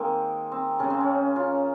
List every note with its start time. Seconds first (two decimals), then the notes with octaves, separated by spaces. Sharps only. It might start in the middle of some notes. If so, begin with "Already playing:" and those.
Already playing: D#3 G#3 A#3 C4
0.52 C4
0.79 C#3 G#3 C#4
0.90 C4
1.00 C#4
1.36 F4